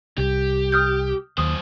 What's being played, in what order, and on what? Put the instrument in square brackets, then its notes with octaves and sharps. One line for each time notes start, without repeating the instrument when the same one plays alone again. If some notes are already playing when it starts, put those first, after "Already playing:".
[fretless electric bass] C2 [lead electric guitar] G4
[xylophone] D#6 F6 G6
[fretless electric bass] D#2 [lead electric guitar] F#3 C5 [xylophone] D#6